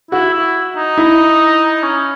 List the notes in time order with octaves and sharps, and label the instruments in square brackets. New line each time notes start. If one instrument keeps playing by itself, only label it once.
[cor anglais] E4 [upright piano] F#4
[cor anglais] E4
D#4
[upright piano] E4
[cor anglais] C#4